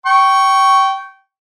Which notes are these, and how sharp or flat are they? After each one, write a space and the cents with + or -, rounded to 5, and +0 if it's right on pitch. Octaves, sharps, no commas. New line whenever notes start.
G5 -20 C#6 +0